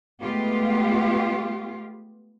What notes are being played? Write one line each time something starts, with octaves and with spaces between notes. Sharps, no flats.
G#3 A3 B3 F4 G4